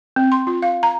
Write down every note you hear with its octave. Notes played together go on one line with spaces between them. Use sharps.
C4
C6
F4
F5
A#5